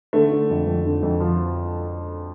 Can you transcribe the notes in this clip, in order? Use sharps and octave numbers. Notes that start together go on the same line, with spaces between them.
D3 A3
D3
F2
F2
D3
F2
F3